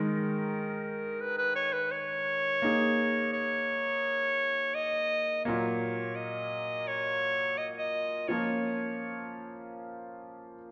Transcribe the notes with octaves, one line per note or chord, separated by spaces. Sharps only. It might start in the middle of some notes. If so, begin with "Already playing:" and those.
Already playing: D#3 G#3 D#4 A#4
B4
B4
C#5
B4
C#5
A#3 D#4 G#4
C#5
D#5
A#2 F#3 A#3 C#5
D#5
C#5
D#5
D#5
F3 A#3 C#4 F4 C#5